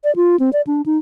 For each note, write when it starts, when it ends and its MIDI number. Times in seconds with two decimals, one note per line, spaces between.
0.04 0.15 74
0.16 0.36 65
0.40 0.50 60
0.53 0.61 74
0.67 0.82 62
0.86 0.98 63